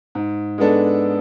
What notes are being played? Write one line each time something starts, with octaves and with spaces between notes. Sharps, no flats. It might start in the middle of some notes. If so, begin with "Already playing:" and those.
G#2
G#3 B3 D4 A4